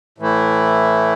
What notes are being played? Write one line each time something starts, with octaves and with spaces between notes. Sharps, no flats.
A2 E3 A3 E4